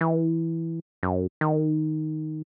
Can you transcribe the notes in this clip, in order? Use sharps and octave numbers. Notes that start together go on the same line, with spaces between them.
E3
F#2
D#3